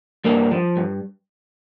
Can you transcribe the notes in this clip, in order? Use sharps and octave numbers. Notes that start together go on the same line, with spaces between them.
G2 A#3 D4
F3
G2